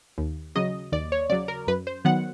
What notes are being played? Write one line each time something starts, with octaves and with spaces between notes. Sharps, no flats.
D#2
C#3 F#3 D#5
D#2 D5
C#5
C#3 F#3 D5
A#4
F#2 B4
C5
D#3 F#3 B3 F#5